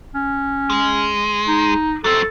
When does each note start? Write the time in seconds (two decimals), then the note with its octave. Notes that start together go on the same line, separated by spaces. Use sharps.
0.15 C#4
0.70 G#3
1.48 D#4
2.04 F#3 C4 A4